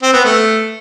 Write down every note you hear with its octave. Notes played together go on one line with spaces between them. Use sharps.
C4
B3
A3